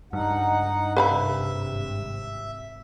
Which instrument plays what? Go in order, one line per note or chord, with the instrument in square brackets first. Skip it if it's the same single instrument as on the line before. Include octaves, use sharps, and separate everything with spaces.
[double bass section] C#2 [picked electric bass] G2 [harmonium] D#4 F#5
[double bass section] G#1 C3 [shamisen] B4 F5 B5 [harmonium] E5